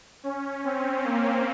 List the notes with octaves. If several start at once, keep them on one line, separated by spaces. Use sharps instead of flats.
C#4
C4
A#3